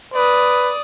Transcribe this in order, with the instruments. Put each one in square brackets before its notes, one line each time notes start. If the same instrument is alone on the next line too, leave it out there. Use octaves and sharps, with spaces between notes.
[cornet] B4 [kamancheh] D5 D#6